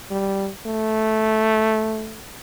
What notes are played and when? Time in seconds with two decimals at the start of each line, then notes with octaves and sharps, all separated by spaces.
0.11 G3
0.66 A3